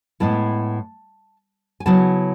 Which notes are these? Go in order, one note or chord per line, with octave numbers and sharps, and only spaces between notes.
A2 G#3 B3 E4 A5
G#5
C#3 F#3 B3 E4 A5